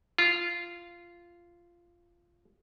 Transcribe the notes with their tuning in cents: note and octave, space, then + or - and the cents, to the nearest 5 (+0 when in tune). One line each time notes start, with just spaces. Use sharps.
F4 -10